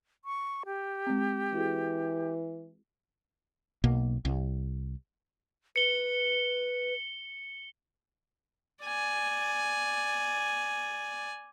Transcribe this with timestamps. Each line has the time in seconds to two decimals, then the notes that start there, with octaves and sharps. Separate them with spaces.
0.25 C#6
0.66 G4
1.07 G#3 C4
1.53 E3 E4 F#4 G#4
3.84 B1 B2 A#3
4.25 C2
5.76 B4 C#7 G7
8.83 D5 G#5